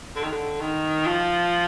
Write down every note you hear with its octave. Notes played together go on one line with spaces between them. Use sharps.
D3
D#3
D3
D#3
F3